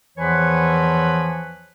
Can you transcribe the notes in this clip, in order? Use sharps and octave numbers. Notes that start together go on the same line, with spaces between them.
E2 E3 F3 B4 C#5